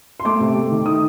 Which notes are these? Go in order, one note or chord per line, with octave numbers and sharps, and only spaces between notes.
C6
A3 D6
C3
A3
D#3
D#4 D#6